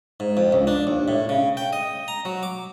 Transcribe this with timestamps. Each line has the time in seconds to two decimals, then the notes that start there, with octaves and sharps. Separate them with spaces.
0.20 G#2
0.37 F2
0.53 C#2
0.67 D4
0.87 D#2
1.08 A2
1.29 C#3
1.57 G5
1.73 D#5
2.08 A#5
2.25 F#3
2.43 D6